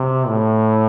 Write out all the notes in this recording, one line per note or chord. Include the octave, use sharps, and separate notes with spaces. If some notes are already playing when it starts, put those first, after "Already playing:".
Already playing: C3
A2